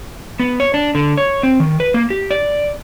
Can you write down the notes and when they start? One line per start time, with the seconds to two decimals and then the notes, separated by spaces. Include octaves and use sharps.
0.40 B3
0.60 C#5
0.74 D4
0.95 D3
1.17 C#5
1.43 C4
1.60 D#3
1.80 B4
1.94 A#3
2.10 G4
2.31 D5